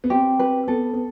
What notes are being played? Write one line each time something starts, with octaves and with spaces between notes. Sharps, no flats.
B3
C4 G4
B4
B3 A4
B3